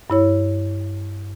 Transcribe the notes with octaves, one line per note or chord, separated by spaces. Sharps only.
G2 E4 C#5